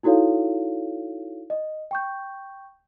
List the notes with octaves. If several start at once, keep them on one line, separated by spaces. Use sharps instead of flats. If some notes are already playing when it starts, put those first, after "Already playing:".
D#4 E4 F#4 A4 C#5 F5
D#5
G5 C#6 G6